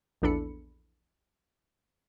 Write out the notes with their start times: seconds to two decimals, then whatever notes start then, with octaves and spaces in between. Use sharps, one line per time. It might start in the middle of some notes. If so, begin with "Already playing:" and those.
0.22 A#1 E2 D4 A4 B5 C#7